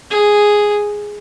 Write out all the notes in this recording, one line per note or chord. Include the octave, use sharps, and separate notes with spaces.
G#4